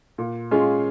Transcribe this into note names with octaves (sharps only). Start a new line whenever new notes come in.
A#2
G#3 C#4 F4 G#4